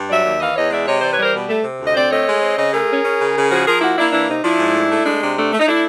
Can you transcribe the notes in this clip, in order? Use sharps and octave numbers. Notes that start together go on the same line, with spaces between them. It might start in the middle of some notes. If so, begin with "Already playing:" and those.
Already playing: G2
F#3 D5 E5
D#2
E3 D#5 F5
E2 C#5 D#5
G#3 D5 E5
C3 C#5 D#5
E3 C5 D5
B4 C#5
G3 A#4 C5
B2
A3
C3
D2
D#5
C4 C5 D5
A3 C#5 D#5
G#3
C4
C#3 C#5 D#5
A3 G#4 A#4
C#4
C#4
C#3
C#3
F3 F#4 G#4
F3 G#4 A#4
A#3 E4 F#4
A#3 D4 E4
E3 D4 E4
C3 D#4
F3 D4 E4
G#2
A3
A3
G#3 D4
C3 D4
A3 D4
A3
D#4
A3 D4 E4